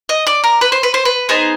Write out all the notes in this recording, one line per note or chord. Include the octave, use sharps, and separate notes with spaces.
D#5
D5
A#4
B4
C5
B4
C5
B4
B3 D#4 G#4 C5